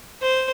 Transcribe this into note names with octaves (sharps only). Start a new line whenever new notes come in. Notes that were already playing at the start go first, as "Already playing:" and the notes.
C5